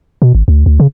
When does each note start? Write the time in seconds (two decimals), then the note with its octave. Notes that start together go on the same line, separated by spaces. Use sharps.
0.22 B2
0.35 G#1
0.48 D2
0.66 D2
0.80 C#3